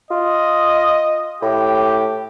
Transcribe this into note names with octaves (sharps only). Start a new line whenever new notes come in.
F4 D#5
A2 G4